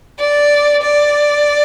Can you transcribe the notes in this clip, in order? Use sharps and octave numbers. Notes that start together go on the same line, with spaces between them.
D5
D5